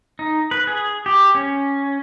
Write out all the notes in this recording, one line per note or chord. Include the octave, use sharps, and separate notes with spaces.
D#4
B4
G#4
G4
C#4